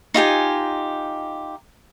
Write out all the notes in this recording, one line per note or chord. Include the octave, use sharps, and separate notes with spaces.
D#4 F4 G4 G#5